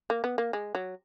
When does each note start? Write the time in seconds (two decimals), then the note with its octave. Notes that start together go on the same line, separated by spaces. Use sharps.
0.10 A#3
0.24 B3
0.38 A#3
0.53 G#3
0.75 F#3